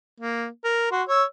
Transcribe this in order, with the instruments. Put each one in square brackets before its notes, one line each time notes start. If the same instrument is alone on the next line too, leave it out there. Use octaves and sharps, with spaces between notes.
[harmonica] A#3
A#4
F#4 C6
C#5 E6